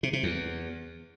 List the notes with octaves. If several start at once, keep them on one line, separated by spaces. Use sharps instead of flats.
C3
C3
E2